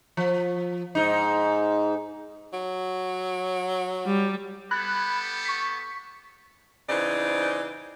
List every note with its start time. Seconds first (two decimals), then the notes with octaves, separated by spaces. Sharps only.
0.17 F3
0.95 G#2 D#4
2.53 F#3
4.06 G3
4.71 B3 G4 A4 B5 F#6 G#6
5.45 C#6 B6
6.88 C#3 E3 C4 D#4 C5 D5